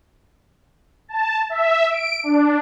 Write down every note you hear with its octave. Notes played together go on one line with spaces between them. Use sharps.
A5
E5
D7
D4